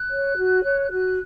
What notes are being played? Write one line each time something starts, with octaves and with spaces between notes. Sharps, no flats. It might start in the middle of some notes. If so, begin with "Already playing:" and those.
Already playing: F#6
C#5
F#4
C#5
F#4 F#6